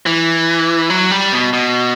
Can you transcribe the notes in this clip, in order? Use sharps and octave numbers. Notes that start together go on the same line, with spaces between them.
E3
F#3
G3
B2
B2